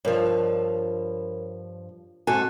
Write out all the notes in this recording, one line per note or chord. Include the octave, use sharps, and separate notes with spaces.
G2 F3 A#4 C#5
G#2 C4 F#4 A4 G#5 F#6